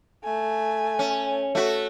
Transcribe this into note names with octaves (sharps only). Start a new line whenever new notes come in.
A3 G#5
C#4
A3 F#4